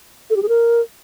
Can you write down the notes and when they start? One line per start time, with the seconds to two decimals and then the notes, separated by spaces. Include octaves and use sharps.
0.30 A4
0.36 G4
0.43 G#4
0.49 A#4